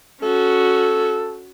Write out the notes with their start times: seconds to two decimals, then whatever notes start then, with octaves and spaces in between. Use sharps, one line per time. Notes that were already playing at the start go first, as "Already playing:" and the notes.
0.23 C#4 F#4 A4